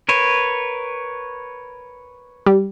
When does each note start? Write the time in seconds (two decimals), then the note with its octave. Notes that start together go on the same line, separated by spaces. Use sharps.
0.09 A#4 B4 C#5
2.46 G3